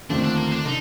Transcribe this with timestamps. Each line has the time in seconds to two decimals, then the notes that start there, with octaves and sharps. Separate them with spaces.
0.10 D#2 D3 F3 A3 C4 D4
0.24 D4
0.37 A#3
0.52 D4
0.65 D3 D#4